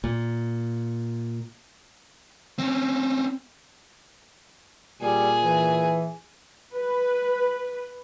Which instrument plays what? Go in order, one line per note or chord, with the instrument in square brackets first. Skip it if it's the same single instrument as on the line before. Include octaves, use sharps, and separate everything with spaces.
[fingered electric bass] A#2
[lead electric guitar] C4 C#4
[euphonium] A#2 [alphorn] G3 [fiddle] G#4
[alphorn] E3
[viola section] B4